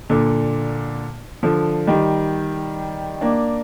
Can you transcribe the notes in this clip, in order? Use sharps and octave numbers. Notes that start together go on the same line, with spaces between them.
A#2 D3
D3 F3
D#3 G3
A#3 D4